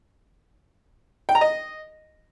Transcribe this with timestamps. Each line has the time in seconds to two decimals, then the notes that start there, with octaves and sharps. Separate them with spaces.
1.29 G5
1.35 A#5
1.41 D#5